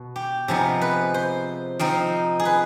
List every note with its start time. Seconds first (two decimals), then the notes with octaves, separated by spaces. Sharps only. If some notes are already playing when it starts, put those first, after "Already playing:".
Already playing: B2 B3
0.16 G4
0.48 C3 F3 B3 D#4 G#4
0.81 B4
1.14 C5
1.79 F3 C4 D#4
2.40 G#4
2.45 B4